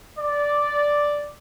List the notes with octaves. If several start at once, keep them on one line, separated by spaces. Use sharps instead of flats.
D5